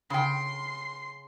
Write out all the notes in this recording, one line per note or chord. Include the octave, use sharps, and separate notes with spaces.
C#3 G5 C6